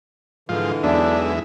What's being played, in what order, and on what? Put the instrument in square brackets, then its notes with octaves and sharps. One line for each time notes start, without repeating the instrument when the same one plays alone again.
[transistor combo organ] G#2 F3 F4 [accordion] D3 E3
[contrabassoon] B1 [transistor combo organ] E2 G#3 E5 [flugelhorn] D4